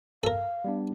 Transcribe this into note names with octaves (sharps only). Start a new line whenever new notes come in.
A4 A#4 F5
G3 B3 D4